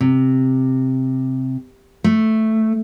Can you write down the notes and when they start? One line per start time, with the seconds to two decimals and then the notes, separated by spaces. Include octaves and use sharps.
0.01 C3
2.04 A3